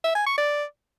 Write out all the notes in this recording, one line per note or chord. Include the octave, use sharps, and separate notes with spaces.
E5
G#5
C#6
D5